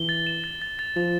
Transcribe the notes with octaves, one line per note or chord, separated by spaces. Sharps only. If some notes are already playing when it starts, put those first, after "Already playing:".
Already playing: E3 G7
A6
E7
A6
A6
A6
F3 A6